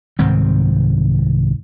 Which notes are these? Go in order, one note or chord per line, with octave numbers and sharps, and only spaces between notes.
C2 G#2 D#3 C4